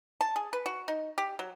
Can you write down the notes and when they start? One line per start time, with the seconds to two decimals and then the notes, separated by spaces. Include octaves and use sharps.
0.21 A5
0.36 G#4
0.53 B4
0.66 F#4
0.88 D#4
1.18 G4
1.39 F#3